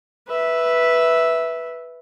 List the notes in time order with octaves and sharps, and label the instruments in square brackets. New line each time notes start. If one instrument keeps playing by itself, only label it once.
[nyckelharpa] B4 E5